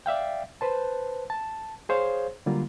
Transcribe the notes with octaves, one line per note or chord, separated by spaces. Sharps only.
D5 E5 F5 G5
B4 C5 A5
A5
G#4 C5 C#5 F5
D3 F#3 G3 A#3 F4